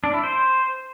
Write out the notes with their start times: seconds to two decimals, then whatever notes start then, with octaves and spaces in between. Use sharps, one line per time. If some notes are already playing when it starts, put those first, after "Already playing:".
0.04 D4
0.14 E4
0.23 C5